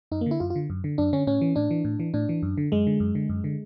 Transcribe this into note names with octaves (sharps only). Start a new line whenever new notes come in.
F#2 D#4
A#3
D3 E4
F#2 F4
F4
D3
F#2
D3
F#2 D4
D3 C#4
A2 C#4
E3
A2 D4
E3
A2
E3
A2 D4
E3
F#2
D3
F#2 G#3
D3
F#2
D3
F#2
D3